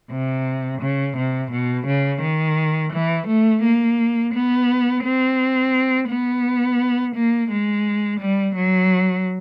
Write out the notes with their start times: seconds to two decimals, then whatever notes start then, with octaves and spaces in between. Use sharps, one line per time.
0.11 C3
0.81 C#3
1.16 C3
1.52 B2
1.86 C#3
2.21 D#3
2.92 E3
3.27 A3
3.62 A#3
4.34 B3
5.04 C4
6.09 B3
7.15 A#3
7.50 G#3
8.20 G3
8.56 F#3